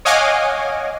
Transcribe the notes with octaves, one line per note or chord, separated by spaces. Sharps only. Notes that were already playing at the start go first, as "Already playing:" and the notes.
C#5 D#5 F5 F#5 G#5 D6